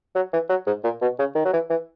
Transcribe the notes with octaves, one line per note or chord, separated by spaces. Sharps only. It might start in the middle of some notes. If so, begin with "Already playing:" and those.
F#3
E3
F#3
G#2
A#2
B2
C#3
D#3
F#3
E3
E3